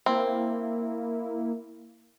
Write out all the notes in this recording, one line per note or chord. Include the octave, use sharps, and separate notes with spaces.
A#3 C4 E4